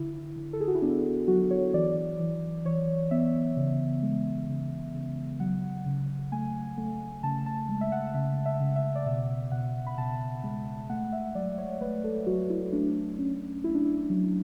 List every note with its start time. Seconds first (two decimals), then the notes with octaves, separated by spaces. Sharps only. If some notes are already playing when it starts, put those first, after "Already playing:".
Already playing: D3 E4
0.36 D3
0.53 A4
0.60 G#4
0.68 F#4
0.75 E4
0.82 B3 D4
1.28 F#3 F#4
1.51 C#5
1.74 E3 D5
2.19 E3
2.65 E3 C#5
3.11 B3 E5
3.57 C#3
4.03 G#3
4.48 C#3
4.94 C#3
5.40 F#3 F#5
5.86 C#3
6.32 A3 G#5
6.78 A3
7.23 C#3 A5
7.46 A5
7.69 G#3
7.81 E5
7.92 F#5
8.14 C#3 E5
8.46 E5
8.60 C#3
8.76 E5
8.95 D5
9.06 B2 E5
9.52 B2 F#5
9.86 B5
9.98 B2 A5
10.44 G#3
10.89 A3 F#5
11.12 E5
11.35 F#3 D5
11.58 C#5
11.81 A3 B4
12.04 A4
12.26 F#3 F#4
12.50 E4
12.72 A3 D4
13.18 C#4
13.64 A3 E4
13.75 D4
13.85 E4
14.10 F#3